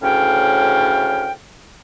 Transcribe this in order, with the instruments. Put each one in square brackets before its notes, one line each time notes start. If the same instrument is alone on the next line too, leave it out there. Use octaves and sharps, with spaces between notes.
[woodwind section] D2 A2 C#3 C#4 F5 G5